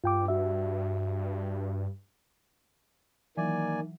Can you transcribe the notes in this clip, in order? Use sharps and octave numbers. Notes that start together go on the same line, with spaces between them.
G2 F4 G5 D6
F#4 E5
D#3 E3 F#3 A#3 D5 G#5